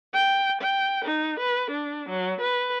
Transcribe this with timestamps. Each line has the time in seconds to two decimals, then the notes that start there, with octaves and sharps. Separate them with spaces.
0.12 G5
0.61 G5
1.04 D#4
1.39 B4
1.70 D4
2.08 F#3
2.40 B4